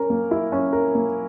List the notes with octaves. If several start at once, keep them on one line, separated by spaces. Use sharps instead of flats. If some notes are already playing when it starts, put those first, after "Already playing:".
Already playing: C#4 A#4
A#3
E4
C#4
A#4
A#3